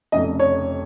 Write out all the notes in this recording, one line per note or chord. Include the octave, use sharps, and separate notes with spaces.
F1 F2 C#3 D#5
C#5